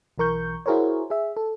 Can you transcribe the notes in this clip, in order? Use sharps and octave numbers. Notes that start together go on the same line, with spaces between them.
B1 E3 A#4 C#6 G6
E4 F#4 G#4 A#4 C5 C#5
G#4 E5
A4